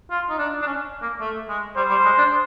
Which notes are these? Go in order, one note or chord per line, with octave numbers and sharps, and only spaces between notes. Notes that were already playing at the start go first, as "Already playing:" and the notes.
F4
D#4
D4
D4
C#4
A#3
A3
G#3
G3 C5
G3
G#3
D4